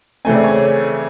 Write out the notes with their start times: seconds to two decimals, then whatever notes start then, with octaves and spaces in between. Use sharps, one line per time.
0.25 C#3 E3 A3 C4 G#5
0.35 D5
0.44 C#5